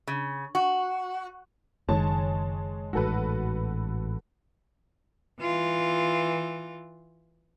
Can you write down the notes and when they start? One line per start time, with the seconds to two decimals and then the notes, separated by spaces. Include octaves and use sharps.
0.07 C#3
0.55 F#4
1.88 F#1 D#3 G#3 C#5 A5
2.93 A1 G#2 F#4 A4 B4
5.41 E3 F4